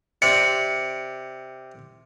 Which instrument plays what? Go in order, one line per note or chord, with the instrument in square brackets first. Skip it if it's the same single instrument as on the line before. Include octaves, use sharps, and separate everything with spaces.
[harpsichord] C3 D5 [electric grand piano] C#7